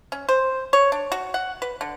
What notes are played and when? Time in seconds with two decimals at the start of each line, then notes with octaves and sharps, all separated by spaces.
0.12 C#4
0.29 C5
0.73 C#5
0.92 D4
1.12 F#4
1.34 F#5
1.62 B4
1.81 D3